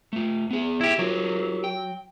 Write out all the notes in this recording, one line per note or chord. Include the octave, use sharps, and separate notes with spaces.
A3 F4
B3 G#4
E4 G4
F#3 F4 G4 A#4
G5